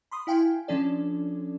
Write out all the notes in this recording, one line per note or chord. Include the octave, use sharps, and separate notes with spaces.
B5 C6 D#6
E4 F5 G5 G#5 C6
F3 C#4 D4 A4 D5